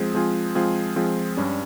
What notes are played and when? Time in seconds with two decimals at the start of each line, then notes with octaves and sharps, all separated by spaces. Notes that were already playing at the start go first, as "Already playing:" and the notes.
Already playing: F3 G#3 C4 F4 G#4
0.14 F3 G#3 C4 F4 G#4
0.55 F3 G#3 C4 F4 G#4
0.96 F3 G#3 C4 F4 G#4
1.37 G2 G3 C#4